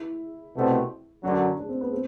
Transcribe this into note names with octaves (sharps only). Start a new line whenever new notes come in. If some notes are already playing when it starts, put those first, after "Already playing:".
Already playing: E4
C2 B2 A3 C4
F#2 D3 F#3 D4
D4
C4
B3
C4